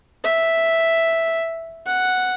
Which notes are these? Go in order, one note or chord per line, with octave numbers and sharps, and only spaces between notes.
E5
F#5